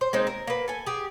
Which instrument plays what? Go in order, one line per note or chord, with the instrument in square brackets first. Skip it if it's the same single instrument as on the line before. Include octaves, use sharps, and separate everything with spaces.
[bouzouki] C5
G#3 A#3 C4 D#4
A#4
A#3 B4
A4 G#5
G4 G#4